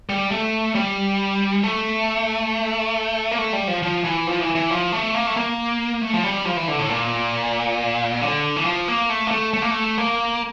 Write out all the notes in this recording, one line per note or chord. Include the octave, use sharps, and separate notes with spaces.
G3
A3
G3
A3
A#3
A3
G3
F3
F3
E3
F3
E3
E3
F3
A3
A#3
A3
A#3
A3
F3
G3
F3
E3
D3
A2
A#2
D3
E3
F3
A#3
A3
A#3
A3
A3
A#3
A3
A#3